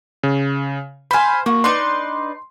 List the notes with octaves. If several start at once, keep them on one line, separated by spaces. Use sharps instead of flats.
C#3
C5 F5 G#5 B5
A#3 F#4
D4 D#4 B4 C6